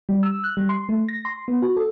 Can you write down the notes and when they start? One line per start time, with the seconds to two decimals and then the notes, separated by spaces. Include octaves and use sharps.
0.09 G3
0.23 E6
0.44 F#6
0.57 G3
0.69 C6
0.89 A3
1.09 A#6
1.25 C6
1.48 B3
1.62 F#4
1.77 A4